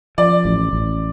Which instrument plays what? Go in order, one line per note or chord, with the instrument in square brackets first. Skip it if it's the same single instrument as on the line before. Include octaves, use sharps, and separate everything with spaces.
[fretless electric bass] F3 [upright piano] D5
[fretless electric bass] A1
A1